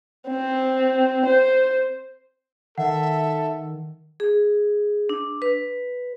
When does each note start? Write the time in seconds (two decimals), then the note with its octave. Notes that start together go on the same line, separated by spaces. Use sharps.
0.28 C4
1.26 C5
2.78 D#3 A4 E5 F#5
4.20 G#4
5.09 D4
5.42 B4